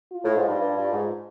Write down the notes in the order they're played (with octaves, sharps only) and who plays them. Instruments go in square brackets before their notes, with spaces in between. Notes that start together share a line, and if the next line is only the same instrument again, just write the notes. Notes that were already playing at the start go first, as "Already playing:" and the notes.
[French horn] F4
[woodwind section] A2
G#2
G2
G2
G2
G#2